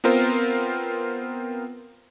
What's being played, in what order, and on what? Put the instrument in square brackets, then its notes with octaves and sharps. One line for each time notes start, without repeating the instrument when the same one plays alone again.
[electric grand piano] B3 C4 F4 A#4 C5